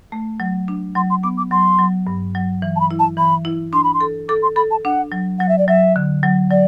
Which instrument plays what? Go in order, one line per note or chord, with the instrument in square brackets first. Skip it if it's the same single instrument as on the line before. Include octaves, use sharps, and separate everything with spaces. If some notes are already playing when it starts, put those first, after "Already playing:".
[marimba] A3
F#3
D4
[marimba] F#3 [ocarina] C6
[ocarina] C6
[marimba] B3 [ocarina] D6
[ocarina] D6
[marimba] F#3 [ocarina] C6
[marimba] F#3
G2
F#3
E3
[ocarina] A5
B5
[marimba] E4
[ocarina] A5
[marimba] E3 [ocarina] B5
[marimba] E4
[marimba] D4 [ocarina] C6
[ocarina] B5
C6
[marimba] A4
[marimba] A4 [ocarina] D6
[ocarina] C6
[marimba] A4 [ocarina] B5
[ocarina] A5
[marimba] D4 [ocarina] F#5
[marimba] F#3
[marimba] F#3 [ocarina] F#5
[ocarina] E5
D5
[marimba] F#3 [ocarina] E5
[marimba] D3
F#3
[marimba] F#3 [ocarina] D5